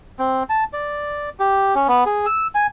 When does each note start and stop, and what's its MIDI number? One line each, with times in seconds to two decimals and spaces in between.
0.19 0.43 60
0.50 0.64 81
0.73 1.30 74
1.40 1.75 67
1.75 1.87 61
1.88 2.04 59
2.06 2.26 68
2.26 2.47 88
2.55 2.67 80